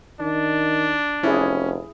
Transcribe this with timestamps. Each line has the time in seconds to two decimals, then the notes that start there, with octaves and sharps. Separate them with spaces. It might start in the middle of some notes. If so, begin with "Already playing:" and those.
0.20 D#3 D4
1.23 F1 C#4 E4 G#4